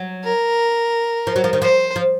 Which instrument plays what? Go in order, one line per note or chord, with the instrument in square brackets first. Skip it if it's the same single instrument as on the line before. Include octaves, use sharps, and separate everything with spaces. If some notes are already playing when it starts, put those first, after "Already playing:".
Already playing: [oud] F#3
[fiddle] A#4
[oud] F3
F#3
F3
D#3
[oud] F3 [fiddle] C5
[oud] F3